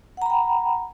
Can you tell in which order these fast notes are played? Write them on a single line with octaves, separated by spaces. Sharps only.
F#5 A#5 B5 G5